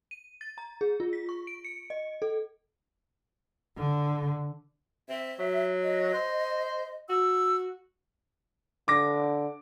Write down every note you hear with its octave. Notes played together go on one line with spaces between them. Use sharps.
D#7
A6
A#5
G#4
F4
B6
C#6
D7
C#7
D#5
A4
D3
C4 E5
F#3
D#5
C5
F#4 E6
D3 D6 A#6